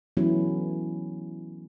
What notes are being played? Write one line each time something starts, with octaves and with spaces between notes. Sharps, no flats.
E3 F#3 A3 B3 C#4 E4